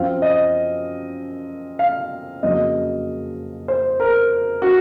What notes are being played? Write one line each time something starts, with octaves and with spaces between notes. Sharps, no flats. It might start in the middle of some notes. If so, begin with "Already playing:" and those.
Already playing: F#2 F3 C4 F5
D#5
F5
F2 C#3 F#3 A#3 D#5
C5
A#4
F#4